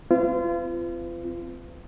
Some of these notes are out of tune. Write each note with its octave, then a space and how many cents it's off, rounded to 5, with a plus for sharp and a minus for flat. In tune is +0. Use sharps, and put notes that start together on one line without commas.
C4 -20 F4 -35 B4 +45